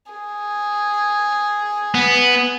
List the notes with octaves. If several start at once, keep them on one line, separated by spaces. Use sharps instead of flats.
G#4
B3